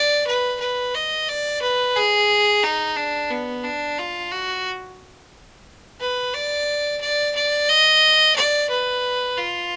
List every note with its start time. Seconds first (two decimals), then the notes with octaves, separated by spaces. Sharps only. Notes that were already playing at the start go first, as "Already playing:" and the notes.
Already playing: D5
0.27 B4
0.60 B4
0.95 D#5
1.29 D5
1.62 B4
1.96 G#4
2.63 D#4
2.97 D4
3.30 B3
3.64 D4
3.98 F4
4.32 F#4
6.01 B4
6.34 D5
7.01 D5
7.36 D5
7.69 D#5
8.36 D5
8.70 B4
9.37 F4